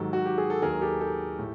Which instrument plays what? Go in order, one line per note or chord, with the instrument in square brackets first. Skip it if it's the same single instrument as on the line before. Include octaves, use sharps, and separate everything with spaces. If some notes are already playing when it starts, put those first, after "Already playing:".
Already playing: [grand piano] G#2 D#3 F#3 G4 A4
F#4
G4
G#4
A4
D#2 D#3 F#3 G#4 A#4
G4 A4
G4 A4
A2